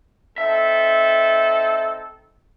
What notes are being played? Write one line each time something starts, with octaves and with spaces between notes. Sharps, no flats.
C4 D#4 A4 E5